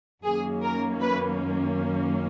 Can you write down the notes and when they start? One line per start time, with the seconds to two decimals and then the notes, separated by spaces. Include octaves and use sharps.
0.25 F#2 D#3 A#3 C#4 G#4
0.63 A#4
1.01 B4